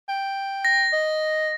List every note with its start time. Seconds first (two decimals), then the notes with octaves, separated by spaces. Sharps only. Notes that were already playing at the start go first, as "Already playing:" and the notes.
0.09 G5
0.65 A#6
0.93 D#5